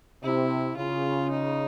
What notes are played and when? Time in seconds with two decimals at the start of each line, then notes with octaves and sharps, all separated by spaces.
0.23 C3 E4
0.76 C#3 F4
1.31 D#4